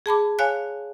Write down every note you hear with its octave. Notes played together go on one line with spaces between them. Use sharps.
G#4 A5 B5 D6
C#5 F5 G#5 F#6